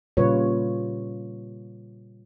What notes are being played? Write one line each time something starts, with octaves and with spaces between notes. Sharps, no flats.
A#2 C#3 G3 F4 B4 C#5